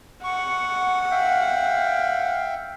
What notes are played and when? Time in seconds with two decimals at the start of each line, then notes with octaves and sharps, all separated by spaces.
0.24 F#5 C#6
1.11 E5 F5 G5